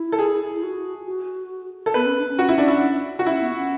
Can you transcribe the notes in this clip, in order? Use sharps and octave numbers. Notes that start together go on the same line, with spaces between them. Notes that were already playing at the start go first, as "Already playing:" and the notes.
Already playing: E4
A4
G#4
E4
F#4
F#4
A4
B3 B4
C#4
D4
C#4
F#4
E4
D4
E4
F#4
C#4 E4
B3
C#4